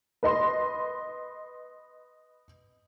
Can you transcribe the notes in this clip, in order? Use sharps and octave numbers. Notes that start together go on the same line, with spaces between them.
B4 D#5 C6